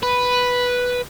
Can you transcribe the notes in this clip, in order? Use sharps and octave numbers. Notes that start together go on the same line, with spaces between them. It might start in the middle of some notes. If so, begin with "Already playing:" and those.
B4